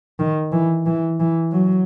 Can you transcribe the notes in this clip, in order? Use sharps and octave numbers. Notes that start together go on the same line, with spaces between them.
D#3
E3
E3
E3
F#3